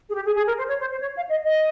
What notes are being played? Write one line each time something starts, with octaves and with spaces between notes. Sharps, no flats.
G#4
G4
G#4
G#4
A#4
C5
C#5
C5
C5
C#5
F5
D#5
D#5